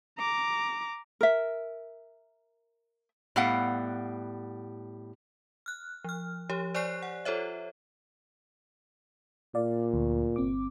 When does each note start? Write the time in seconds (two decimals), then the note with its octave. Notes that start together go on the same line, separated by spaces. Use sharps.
0.18 A#5 D6
1.21 A#4 E5
3.36 A2 G3 B3 F5 F#5
5.66 F6 F#6
6.04 F3 F6
6.50 F3 G4 C#5
6.74 C5 D5 G#5 C#6 F#6 C7
7.03 F#5
7.25 F4 A4 C5 C#5 E5
9.55 A#2 D5 F5
9.94 D2
10.36 G1 C4 D6